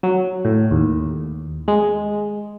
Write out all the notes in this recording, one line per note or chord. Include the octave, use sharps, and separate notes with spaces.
F#3
A2
D#2
G#3